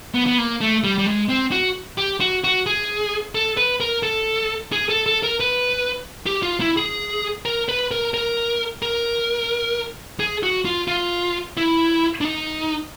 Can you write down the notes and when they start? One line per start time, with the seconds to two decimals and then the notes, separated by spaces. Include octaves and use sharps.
0.14 B3
0.27 B3
0.38 A#3
0.61 A3
0.84 G3
0.98 G3
1.06 G#3
1.29 C4
1.52 F#4
1.98 G4
2.20 F#4
2.44 F#4
2.66 G#4
3.35 A4
3.57 B4
3.80 A#4
4.03 A4
4.72 G#4
4.89 A4
5.06 A4
5.23 A#4
5.40 B4
6.26 G4
6.42 F4
6.60 E4
6.77 G#4
7.45 A#4
7.69 B4
7.91 A#4
8.14 A#4
8.82 A#4
10.20 G#4
10.43 F#4
10.65 F4
10.88 F4
11.57 E4
12.21 D4
12.25 D#4